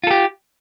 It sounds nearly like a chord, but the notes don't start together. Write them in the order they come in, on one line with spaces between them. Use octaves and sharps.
F4 A4 G4